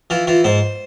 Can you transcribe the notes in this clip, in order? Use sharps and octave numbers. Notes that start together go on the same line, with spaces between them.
E3 F4
E3 F4
G#2 C5